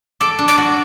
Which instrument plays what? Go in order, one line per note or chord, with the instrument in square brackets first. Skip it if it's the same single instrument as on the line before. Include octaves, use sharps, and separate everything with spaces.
[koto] A4 [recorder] D6
[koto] D4
[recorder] D6
[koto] F#4